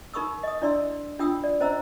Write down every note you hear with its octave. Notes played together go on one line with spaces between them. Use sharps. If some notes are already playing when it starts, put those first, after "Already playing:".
D#4 A#4 B5 C#6 D#6 E6
D#5 D#6
D4 E4 D5 C6 E6
D4 F4 G5 D#6 E6
D5
C#4 C5 D#5 A#5 E6